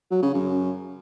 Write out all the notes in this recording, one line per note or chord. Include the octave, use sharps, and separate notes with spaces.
F#3
C#3
F#2